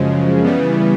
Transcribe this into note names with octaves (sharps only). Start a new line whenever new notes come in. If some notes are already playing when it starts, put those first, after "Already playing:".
Already playing: F#2 C#3 F3 G#3
C#3 E3 G3 B3